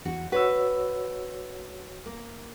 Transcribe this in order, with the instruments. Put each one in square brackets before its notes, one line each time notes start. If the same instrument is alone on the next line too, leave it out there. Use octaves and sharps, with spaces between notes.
[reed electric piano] E2 [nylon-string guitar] F#4
[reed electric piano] F#4 C#5 E6 [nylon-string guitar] B4
[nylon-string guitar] A#3